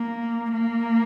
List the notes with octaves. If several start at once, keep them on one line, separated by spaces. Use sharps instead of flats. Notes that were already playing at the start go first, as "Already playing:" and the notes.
Already playing: A#3
A#3